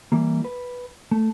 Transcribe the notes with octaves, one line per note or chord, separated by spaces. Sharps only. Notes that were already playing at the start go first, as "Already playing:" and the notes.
E3 G3 A#3
B4
A3